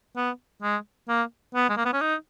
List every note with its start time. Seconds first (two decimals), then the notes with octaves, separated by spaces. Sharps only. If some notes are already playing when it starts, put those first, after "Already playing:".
0.16 B3
0.63 G#3
1.08 A#3
1.55 B3
1.69 G#3
1.77 A#3
1.85 B3
1.93 C#4
2.01 D#4